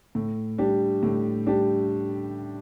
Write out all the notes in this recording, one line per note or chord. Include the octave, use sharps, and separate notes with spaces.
A2
G3 D4 G4
A2
G3 D4 G4